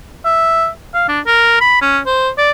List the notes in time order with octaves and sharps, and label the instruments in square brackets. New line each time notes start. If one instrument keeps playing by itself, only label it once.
[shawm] E5
F5
D4
A#4
B5
C#4
C5
D5